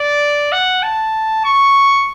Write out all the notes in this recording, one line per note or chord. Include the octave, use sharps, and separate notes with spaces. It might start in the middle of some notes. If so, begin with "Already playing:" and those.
Already playing: D5
F#5
A5
C#6